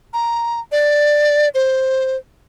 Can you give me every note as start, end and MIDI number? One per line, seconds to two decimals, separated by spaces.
0.14 0.60 82
0.72 1.49 74
1.54 2.17 72